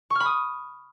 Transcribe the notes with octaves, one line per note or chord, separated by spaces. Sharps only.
B5 C#6 D#6 F6